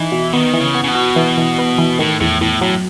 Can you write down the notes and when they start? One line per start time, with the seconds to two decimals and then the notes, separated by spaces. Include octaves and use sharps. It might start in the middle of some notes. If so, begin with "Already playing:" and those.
Already playing: E3 D#4
0.12 B2
0.33 D#3 B3
0.54 E3
0.60 C#3
0.75 B3
0.84 C#3
0.88 B2
0.95 F#4
1.16 E3
1.38 E3
1.58 B3
1.78 E3
1.99 A2 D#3
2.20 E2 A2
2.41 E2 A2
2.61 A2 F#3